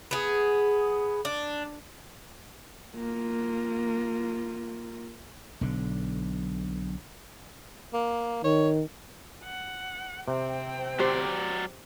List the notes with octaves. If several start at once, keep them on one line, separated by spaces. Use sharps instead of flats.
B3 G#4
D4
A#3 F4
B1 D3
A#3
D#3 C#5
F#5
C3 C4 G5
F#3 G4 C5 D5